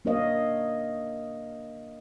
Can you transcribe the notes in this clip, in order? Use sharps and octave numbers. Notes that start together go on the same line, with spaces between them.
A#3 D4 A#4 C#5 D#5 F5